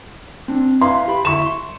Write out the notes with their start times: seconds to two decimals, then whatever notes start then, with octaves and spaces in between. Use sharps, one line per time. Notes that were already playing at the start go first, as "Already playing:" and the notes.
0.48 C4 D4
0.81 E4 B4 F5 C6
1.08 G4 B5
1.25 D2 E4 C#6 E7
1.46 C6